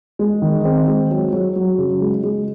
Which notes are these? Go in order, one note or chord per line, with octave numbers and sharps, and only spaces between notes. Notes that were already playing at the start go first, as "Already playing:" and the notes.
G#3
D#3
C4
G#3
F#3
F#3
F#3
C#3
G#3
G#3